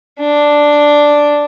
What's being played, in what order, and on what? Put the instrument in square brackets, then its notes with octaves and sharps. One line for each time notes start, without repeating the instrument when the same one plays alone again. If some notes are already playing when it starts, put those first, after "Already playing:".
[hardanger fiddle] D4